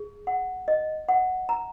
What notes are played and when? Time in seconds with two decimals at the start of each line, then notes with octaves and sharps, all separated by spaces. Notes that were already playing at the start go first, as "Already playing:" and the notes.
Already playing: G#4
0.27 F#5
0.68 D#5
1.08 F#5
1.49 A#5